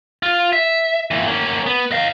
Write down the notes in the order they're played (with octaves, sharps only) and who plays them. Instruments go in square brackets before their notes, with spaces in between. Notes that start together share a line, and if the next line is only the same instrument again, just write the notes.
[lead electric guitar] F4
E5
A#2 E3
A#3 C#4
B3
D#5 F5